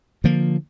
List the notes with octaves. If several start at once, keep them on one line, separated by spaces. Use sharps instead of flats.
D3 F3 A#3